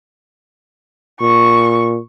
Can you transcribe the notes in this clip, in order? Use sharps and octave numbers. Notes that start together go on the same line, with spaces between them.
A#2 C#6